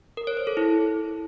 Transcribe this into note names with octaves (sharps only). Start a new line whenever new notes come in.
A#4
C#5
C5
A4
E4